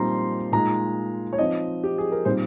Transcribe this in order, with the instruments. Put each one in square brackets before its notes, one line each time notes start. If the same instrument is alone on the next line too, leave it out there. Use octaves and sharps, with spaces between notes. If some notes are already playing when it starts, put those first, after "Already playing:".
Already playing: [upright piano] A#2 G3 C4 D#4 A#5 C6
A#2 G#3 D#4 A#5
C#5
F3 C4 D#4 D#5
G4
G#4
A#4
A#2 G3 C4 D#4 C5